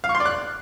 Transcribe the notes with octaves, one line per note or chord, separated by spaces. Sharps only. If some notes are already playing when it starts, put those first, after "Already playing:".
F5
C#6
C6
D5
F#6